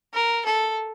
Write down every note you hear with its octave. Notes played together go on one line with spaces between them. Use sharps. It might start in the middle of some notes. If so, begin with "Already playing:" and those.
A#4
A4